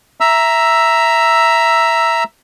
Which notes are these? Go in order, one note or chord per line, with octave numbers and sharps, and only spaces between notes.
E5 A#5 E6